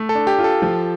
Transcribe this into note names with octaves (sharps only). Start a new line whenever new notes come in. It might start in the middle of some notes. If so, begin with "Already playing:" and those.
Already playing: A3
A4
D4
G4
F4
A4
F3